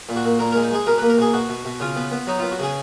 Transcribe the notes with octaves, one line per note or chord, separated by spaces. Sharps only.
A#2
F#4
A#2
A#2 A#4
G#3 A#4
D#4
G#3 G#4
B2 A#4
A#3 B4
A#4
B2 G#4
B2 F#4
B2
B2
C#3 F4
B3
B3
F#3 D#4
B3 F4
F#4
C#3 G#4